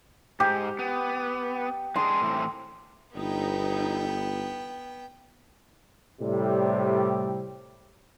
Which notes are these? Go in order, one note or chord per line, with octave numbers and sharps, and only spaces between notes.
G#2 G4
B3
G#3 D4 G#4 C6
A2 E3 C4
G1 B3 D#4 E4 G5
A2 C3 G3